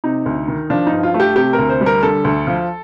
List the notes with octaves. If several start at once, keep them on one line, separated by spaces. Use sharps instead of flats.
C3 D#4
D2
D#3
F3 D4
D#4
G2
F4
A3
G4
C3 G4
A#4
D2
C5
G3
A#4
D3 A4
D2
F3